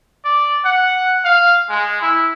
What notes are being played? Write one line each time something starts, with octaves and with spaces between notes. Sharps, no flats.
D5
F#5
F5
G#3
E4